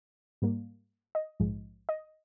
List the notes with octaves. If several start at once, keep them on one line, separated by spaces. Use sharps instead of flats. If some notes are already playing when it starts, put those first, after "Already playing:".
G#2 G3 A#3
D#5
A#1 G#2 F3 G#3
D#5